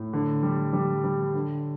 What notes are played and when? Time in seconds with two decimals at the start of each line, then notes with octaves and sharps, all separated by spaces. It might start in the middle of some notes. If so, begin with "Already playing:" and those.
Already playing: A2
0.13 D3
0.43 G3
0.73 G3
1.04 G3
1.34 D3